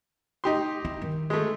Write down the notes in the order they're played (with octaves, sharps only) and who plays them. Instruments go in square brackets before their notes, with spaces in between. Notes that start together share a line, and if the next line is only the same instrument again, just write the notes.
[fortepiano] D#4 G4 C6
[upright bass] E4
D#3
[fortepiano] G#3 A3